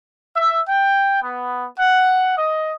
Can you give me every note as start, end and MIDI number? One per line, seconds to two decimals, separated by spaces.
0.36 0.62 76
0.69 1.21 79
1.23 1.67 59
1.80 2.38 78
2.38 2.72 75